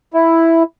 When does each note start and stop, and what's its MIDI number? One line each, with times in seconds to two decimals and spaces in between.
0.14 0.63 64